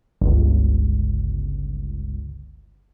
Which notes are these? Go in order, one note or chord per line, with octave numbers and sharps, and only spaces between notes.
G1 C#2